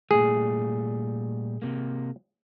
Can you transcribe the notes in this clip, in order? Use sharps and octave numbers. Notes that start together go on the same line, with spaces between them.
A#2 G3 A3 G#4
C3 A#3